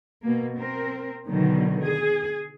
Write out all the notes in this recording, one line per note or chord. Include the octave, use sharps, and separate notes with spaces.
B2 A#3
C4 A#4
B2 D3 D#3 F#3
G#4